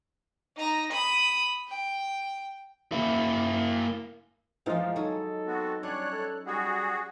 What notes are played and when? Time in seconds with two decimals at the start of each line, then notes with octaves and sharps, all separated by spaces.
0.57 D#4 A#5
0.92 B5 D#6
1.68 G5
2.92 A#3 E4
4.66 E3 F3 G#3 D#4 F4
4.96 F#3 G#3 D#4 A4
5.47 B3 C4 F#4
5.83 G3 C#4 D4 C#5 F#6
6.12 A4
6.46 G3 F#4 G#4